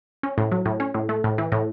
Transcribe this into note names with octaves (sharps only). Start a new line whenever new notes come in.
C#4
A2
F#3
A2
C#4
A2
A3
A2
E3
A2